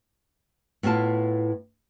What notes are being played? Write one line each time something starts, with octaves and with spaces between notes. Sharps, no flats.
A2 B3 E4 F4 A5